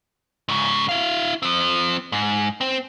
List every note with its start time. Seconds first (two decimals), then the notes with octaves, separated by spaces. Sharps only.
0.49 G#2 C#3
0.89 E4 F5
1.42 F3 C4
2.12 G#2
2.61 C4